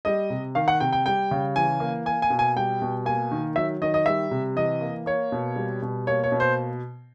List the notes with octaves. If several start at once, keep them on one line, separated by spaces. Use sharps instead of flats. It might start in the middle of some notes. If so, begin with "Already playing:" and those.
G3 D#5
C3
D#3 F5
F#5
C3 G5
G5
G3 G5
C#3
E3 G#5
A#3
A#3 G#5
G#5
B2
G#5
G3 G5
B2
A#3 G#5
D#3
F#3 E5
D#3 D#5
D#5
G3 E5
C3
E3 D#5
A#3
A#3 C#5
B2
G3
B2
A#3 C#5
C#5
B2
C5